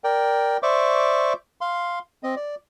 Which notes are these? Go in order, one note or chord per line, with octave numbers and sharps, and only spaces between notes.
A#4 D5 G5
C5 D5 E5 C#6 D6
F5 C6
C4 D#5
D5